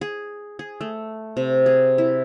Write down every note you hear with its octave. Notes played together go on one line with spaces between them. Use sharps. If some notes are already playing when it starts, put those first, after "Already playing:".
G#4
G#4
A3
C3
G#4
E4